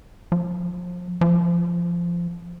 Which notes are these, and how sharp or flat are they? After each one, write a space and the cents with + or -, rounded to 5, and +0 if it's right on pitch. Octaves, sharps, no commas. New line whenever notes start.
F3 +30
F3 -15